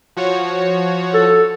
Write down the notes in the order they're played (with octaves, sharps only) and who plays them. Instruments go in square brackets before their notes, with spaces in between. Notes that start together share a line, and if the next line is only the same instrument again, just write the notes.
[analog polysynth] F3 F#4 C#5
[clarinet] A4